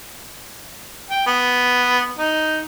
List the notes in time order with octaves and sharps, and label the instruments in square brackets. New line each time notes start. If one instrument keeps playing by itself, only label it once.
[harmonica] G5
B3
D#4